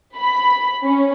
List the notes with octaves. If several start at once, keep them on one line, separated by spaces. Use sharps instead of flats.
B5
C#4